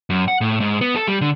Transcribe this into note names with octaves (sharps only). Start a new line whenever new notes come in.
F#2
F#5
A2
G#2
B3
A4
G3
D3